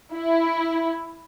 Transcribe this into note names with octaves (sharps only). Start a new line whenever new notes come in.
E4